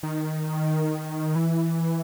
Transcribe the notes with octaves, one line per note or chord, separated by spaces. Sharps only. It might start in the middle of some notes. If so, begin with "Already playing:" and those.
D#3
E3